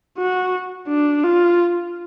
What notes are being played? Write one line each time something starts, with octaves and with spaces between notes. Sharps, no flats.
F#4
D4
F4